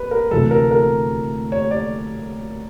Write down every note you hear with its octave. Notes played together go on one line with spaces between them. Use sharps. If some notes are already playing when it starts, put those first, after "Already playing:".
Already playing: B4
A#4
D2 C3 E3 A3 A4
A#4
A#4
C#5
D5